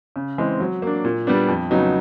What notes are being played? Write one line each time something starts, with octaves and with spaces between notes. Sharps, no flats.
C#3
E3 G#3 C4
F#3
A#3 D4
A#2
G3 B3 D4
F2
C#3 F#3 B3 D#4